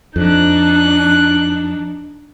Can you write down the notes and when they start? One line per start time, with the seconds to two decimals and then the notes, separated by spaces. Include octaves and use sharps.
0.16 F2 D4 D#4 F#6